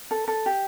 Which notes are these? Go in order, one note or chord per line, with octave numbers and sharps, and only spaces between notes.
A4
A4
G4